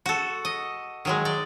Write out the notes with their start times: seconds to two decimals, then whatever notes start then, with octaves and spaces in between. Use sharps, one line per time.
0.06 F#4 A4
0.45 D#5
1.05 D#3 F#3 G#3
1.25 D5 G5